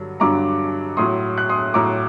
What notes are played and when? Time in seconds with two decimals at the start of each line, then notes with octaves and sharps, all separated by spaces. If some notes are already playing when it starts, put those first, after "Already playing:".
Already playing: G2 D3 F#3
0.20 G2 D3 F#3 A#5 D6
0.97 A2 F#3 C6 D#6
1.38 F#6
1.49 C6 D#6
1.74 A2 F#3 A#5 D6